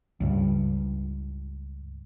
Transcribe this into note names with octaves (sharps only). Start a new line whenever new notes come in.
C#2 G2